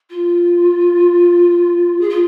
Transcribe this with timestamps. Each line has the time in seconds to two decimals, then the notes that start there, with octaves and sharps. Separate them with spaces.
0.10 F4
2.01 G#4
2.09 F4